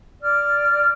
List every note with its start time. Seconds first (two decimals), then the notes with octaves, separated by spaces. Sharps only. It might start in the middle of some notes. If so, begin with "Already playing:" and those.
0.21 D5 F6